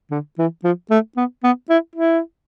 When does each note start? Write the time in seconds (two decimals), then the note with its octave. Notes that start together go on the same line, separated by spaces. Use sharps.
0.11 D3
0.38 E3
0.64 F3
0.90 A3
1.17 B3
1.43 B3
1.69 E4
1.95 E4